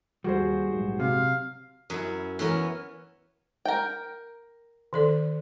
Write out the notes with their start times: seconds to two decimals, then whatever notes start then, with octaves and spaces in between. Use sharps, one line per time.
0.24 D#2 G3 F#4 G#4 C5
0.68 A#1 G#2 F#3
1.00 C3 F5
1.90 F#2 E4
2.39 E3 B3 C#4 A#4
3.65 A#4 G5
4.93 D#3 A4 D5